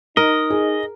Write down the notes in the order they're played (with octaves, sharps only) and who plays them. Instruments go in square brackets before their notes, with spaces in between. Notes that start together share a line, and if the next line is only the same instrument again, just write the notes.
[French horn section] D#4 [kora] A#4 [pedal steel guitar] D#5
[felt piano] G#4